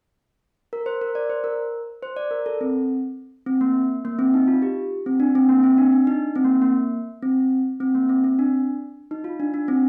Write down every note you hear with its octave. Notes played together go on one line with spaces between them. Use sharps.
A#4
C5
A#4
D5
C5
A#4
C5
D5
A#4
A4
C4
C4
A#3
A#3
C4
D#4
F4
G4
C4
D4
C4
A#3
C4
D4
D4
D#4
C4
A#3
A#3
C4
C4
A#3
C4
C4
D4
D#4
F4
D4
D4
C4